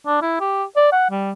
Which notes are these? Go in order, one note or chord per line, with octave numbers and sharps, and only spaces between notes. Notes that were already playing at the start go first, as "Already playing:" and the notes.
D4
E4
G4
D5
F#5
G3